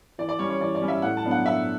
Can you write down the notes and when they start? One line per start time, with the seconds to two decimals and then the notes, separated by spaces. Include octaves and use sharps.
0.18 E3 D5
0.29 D5
0.39 G3 C#4 C#5
0.50 C#5
0.61 E3 D5
0.75 D5
0.82 G3 C#4
0.88 E5
1.02 A2 F#5
1.17 A5
1.24 F#3 B3 D4
1.31 F#5
1.46 A2 E5